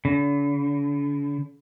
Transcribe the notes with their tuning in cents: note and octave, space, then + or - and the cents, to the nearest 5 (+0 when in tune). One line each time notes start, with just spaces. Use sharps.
D3 -45